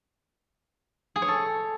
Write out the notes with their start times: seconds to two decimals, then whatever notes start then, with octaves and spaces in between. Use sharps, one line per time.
1.16 G#4
1.22 C#5
1.28 A4